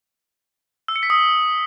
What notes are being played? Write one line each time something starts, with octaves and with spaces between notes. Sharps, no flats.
E6
C#7
B6
D#6